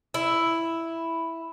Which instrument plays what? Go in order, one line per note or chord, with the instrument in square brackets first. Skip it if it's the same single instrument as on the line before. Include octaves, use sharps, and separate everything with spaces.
[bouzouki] E4